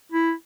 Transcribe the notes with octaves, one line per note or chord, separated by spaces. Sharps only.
E4